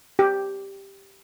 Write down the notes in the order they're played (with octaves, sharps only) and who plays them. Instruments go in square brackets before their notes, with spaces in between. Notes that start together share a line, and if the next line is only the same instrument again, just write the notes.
[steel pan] G4